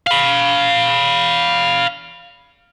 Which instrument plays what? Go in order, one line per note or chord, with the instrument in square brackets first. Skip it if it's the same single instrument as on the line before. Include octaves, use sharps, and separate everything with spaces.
[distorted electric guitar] F5 B5